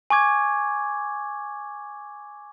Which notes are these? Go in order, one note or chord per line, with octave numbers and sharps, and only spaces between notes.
G#5 C#6 D6 G#6